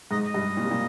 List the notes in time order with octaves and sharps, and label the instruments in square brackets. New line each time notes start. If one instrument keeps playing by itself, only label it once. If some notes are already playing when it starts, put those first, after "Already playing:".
[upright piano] G#2 [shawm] D#5
[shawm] D#5
[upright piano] G2
A#2
C3
A#2